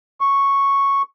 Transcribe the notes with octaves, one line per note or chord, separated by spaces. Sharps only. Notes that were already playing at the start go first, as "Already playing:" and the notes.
C#6